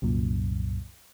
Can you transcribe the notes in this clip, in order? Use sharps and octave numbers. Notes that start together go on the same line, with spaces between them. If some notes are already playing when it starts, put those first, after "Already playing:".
C2 F#2 A#2